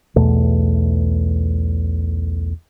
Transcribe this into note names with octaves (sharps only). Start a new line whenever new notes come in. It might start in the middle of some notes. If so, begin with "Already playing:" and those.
B1 E2 B2 A3